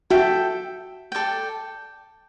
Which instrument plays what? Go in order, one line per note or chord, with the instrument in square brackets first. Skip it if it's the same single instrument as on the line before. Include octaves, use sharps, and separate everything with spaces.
[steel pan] F#4 [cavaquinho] A4 E5 G5
[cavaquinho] A4 D5 G5